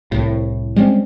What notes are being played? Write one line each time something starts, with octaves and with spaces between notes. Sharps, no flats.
C2 A2
G3 G#3 C4 C#4